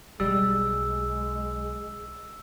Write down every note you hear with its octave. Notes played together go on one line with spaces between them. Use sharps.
B1 G3 G#3 E6